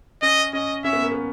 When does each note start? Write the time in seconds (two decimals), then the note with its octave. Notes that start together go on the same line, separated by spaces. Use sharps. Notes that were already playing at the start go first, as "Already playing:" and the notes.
0.22 C#4 D#5
0.53 C#4 D#5
0.84 C#4 E5
0.93 B3
1.02 A#3
1.12 B3